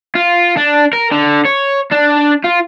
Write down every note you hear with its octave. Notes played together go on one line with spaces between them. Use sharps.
F4
D4
A#4
D3
C#5
D4
F4